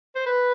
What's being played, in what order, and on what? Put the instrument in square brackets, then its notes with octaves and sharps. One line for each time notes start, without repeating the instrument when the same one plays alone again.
[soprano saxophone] C5
B4